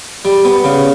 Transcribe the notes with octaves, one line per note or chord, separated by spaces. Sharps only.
G3
B3
C#3